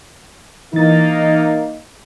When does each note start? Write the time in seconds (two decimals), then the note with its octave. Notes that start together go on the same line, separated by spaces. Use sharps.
0.73 E3 A#3 D#4 A6